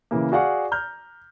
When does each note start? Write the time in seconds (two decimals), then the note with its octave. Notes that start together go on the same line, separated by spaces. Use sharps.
0.11 C#3 E3 A#3
0.32 F#4 G#4 D5 F5 F#5 C#6
0.72 A#5 F6 G6